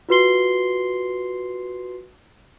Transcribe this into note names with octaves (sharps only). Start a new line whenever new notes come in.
F4 F#4 B4 C6 C7 G7